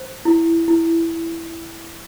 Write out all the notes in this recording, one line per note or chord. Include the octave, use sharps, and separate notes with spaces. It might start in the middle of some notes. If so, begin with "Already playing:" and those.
Already playing: C5
E4
E4